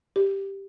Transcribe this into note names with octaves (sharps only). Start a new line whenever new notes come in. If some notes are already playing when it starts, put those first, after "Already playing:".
G4